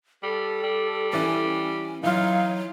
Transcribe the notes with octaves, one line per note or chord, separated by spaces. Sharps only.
G3 A4
G3
E3 C#4 D5
E3 F#3 D#4 F4 F5